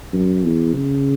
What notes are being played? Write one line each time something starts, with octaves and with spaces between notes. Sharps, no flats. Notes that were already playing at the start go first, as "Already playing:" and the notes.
F#2
E2
C#3